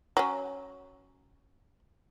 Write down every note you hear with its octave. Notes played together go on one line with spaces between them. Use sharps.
F#3 C#4